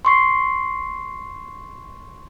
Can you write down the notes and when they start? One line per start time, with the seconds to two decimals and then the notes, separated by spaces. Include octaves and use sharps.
0.05 C6 C#6 C7